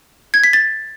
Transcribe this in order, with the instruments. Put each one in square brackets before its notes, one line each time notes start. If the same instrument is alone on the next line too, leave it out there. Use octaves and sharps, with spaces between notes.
[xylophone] G#6
B6
A6